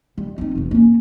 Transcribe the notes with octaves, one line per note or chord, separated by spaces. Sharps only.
G3
C4 D#4
E1 E2
A#3 C#4